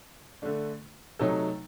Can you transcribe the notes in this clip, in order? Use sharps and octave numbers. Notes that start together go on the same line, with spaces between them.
D3 A3 D4
C3 F#3 A3 D#4 A4